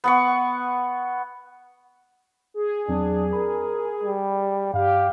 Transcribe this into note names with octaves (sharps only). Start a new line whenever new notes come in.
B3 F#5 C#6
G#4
E2 F#3 C4 D4
A#4 B5
G3
G2 G4 F5